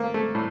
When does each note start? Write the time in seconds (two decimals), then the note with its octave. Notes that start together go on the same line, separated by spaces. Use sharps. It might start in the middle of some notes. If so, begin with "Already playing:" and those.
Already playing: A3 A#3
0.14 A3
0.35 A2